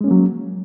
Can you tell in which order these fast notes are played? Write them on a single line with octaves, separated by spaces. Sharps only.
G#3 C#4 A#3 F#3